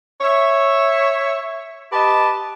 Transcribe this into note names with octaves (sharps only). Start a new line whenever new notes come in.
C#5 E5
G4 B4 D#5 A5